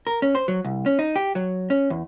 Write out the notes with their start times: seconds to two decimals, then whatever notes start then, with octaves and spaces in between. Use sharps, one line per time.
0.07 A#4
0.22 C#4
0.35 C5
0.48 F#3
0.65 C2
0.86 C#4
0.99 D#4
1.16 G4
1.35 F#3
1.70 C#4
1.90 E2